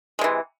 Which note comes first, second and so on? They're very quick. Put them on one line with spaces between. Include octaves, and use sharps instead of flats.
G#3 C3 E3